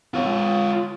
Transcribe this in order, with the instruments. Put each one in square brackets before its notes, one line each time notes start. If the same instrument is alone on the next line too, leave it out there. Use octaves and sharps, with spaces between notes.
[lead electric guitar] F4 C#5